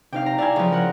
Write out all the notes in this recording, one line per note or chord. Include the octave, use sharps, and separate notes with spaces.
C3 D#4 F5 G5
A#5
E4 D5 F5 G#5
C#3 F3
A#4 F#5